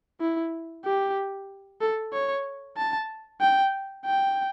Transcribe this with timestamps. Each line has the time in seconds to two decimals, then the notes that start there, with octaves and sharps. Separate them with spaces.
0.21 E4
0.85 G4
1.81 A4
2.13 C#5
2.77 A5
3.41 G5
4.06 G5